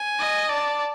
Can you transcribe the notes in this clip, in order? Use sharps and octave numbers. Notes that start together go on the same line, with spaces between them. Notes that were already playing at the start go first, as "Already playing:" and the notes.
Already playing: G#5
D#5
D5 A5